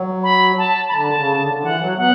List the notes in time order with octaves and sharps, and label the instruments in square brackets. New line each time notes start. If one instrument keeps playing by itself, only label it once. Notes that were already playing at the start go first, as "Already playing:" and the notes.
Already playing: [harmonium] F#3
[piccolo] B5
A5
B5
[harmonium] D3 [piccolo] A5
[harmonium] C#3
D3
D3
[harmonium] E3 [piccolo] F#5
[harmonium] F#3
[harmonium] B3 [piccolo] F#5